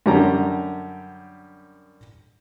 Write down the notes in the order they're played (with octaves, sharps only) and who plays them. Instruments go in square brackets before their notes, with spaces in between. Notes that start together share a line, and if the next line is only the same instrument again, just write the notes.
[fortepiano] F#2 D3 G3 G4 A5 A#5